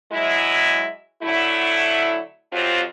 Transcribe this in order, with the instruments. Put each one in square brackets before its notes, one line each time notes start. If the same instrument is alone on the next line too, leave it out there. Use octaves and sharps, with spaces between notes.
[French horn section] F#3 G#3 E4
D3 F#3 A3 E4
F2 C3 F#3 C4 F4